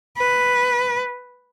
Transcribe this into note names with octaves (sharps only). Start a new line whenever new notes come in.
B4